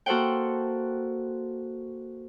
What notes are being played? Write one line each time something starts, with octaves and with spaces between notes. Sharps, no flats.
A#3 F#4 A4 C5 F#5 G5